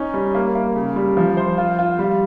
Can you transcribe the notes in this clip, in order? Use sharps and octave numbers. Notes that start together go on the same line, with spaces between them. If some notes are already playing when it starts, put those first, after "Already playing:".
Already playing: C#4 D#4
G3
A#3
A#3
C#3
G3
F3
C5
F4
F4
G3